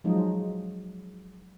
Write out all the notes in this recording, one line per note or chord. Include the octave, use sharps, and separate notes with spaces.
F3 F#3 G#3 D#4